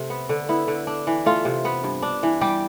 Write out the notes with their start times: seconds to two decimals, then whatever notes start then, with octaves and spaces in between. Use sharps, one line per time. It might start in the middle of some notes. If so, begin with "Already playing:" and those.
Already playing: C3 A3
0.10 B3
0.29 D3
0.49 B3 E4
0.68 D3
0.87 D4
1.07 E3
1.26 A3 F4
1.45 C3
1.65 B3
1.84 G2
2.02 D4
2.23 E3
2.41 G3 G4